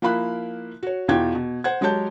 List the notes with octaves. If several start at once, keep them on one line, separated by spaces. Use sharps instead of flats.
F3 A#3 E4 F5 B5 F#6
F#4 C#5
E2 B2 E3 F4 G5 G#6
B2
C5 F#5 G#6
F#3 G#3 G4 C#5 A5 G6